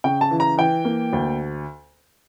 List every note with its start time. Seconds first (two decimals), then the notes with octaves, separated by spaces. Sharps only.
0.04 C#3 G5
0.21 A5
0.31 E3
0.40 A#5
0.57 E3 G5
0.85 A#3
1.13 D2